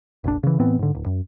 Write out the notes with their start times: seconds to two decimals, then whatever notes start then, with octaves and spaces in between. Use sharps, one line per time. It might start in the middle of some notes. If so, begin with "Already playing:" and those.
0.24 F1 A#1 D4
0.43 C#3 E3
0.60 A2 E3 B3 C4
0.79 G#2 D3
0.95 D1
1.06 F#2